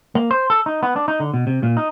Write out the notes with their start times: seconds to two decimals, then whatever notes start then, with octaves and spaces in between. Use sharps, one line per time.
0.15 A#3
0.31 C5
0.50 A4
0.66 D#4
0.83 B3
0.96 D4
1.08 D#4
1.20 D3
1.34 B2
1.47 C3
1.63 A#2
1.77 D#4